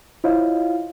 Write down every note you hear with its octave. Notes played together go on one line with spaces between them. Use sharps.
E4 F4 C5 C#5 D#5 F5